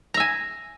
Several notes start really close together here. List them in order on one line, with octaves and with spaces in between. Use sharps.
A#5 E5 G#5